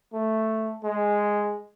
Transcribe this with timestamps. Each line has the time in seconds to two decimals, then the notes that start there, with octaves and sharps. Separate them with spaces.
0.13 A3
0.84 G#3